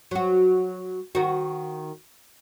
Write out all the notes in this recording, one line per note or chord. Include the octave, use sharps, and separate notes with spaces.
F#3 F#4
D#3 F#4